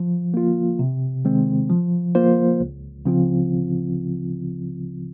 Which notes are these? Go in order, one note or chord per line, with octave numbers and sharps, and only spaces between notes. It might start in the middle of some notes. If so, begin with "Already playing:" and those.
Already playing: F3
A#3 F4
C3
D#3 G#3 C4
F3
A#3 F4 C5
C#2
C#3 F3 C4 F4